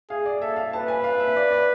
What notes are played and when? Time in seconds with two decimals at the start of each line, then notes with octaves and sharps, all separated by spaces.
0.10 G#4 F5
0.26 D5
0.41 A4 E5
0.56 F5
0.73 B4 A5
0.88 G#5
1.04 F5
1.20 E5
1.36 D5
1.51 D5